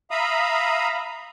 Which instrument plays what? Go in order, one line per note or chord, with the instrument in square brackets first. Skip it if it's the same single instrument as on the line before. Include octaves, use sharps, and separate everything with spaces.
[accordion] E5 F5 A#5 B5 D#6